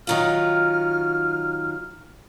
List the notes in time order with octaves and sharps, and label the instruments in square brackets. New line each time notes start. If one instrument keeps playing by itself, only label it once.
[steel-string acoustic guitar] D#3 F#3 F4 [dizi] F6